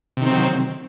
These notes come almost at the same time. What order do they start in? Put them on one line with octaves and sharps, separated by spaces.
C3 D#3 C4 F#3